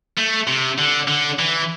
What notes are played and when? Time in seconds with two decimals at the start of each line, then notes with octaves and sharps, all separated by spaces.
0.18 A3
0.47 C3
0.78 D3
1.08 D3
1.39 E3